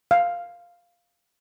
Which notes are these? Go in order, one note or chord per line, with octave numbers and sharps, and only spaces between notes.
F5